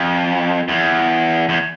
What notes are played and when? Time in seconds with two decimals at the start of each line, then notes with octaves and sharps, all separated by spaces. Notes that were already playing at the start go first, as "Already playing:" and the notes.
Already playing: F2
0.68 E2
1.49 E2